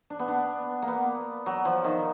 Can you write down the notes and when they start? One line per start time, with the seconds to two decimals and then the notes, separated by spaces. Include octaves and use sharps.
0.10 D4
0.19 B3
0.28 D4
0.82 A#3
0.88 B3
1.46 F#3
1.65 F3
1.84 D#3